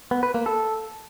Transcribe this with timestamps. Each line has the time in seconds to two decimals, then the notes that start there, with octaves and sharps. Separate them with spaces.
0.11 B3
0.23 B4
0.34 A#3
0.46 A4